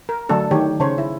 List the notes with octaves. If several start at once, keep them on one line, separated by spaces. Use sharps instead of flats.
A#4
D3 F#3 A3 D4 A4
D#3 A3 G4 C#5
C#3 C5 C#5
E4